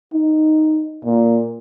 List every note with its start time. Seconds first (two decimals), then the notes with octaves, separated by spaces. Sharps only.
0.14 D#4
1.05 A#2